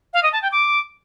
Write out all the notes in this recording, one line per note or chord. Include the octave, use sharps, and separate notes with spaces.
F5
D#5
A5
G5
D6